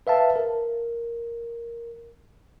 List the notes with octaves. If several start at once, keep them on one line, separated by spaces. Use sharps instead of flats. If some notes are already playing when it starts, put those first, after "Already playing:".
B4 E5 F5 A5
A#4